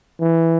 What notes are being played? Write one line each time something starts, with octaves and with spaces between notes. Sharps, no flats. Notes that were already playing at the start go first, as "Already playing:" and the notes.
E3